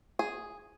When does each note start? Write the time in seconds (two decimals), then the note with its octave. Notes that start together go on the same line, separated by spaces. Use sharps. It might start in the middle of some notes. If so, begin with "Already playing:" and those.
0.19 G#4